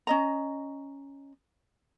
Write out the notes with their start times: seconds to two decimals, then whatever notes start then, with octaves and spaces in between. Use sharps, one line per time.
0.07 C#4 D#5 A#5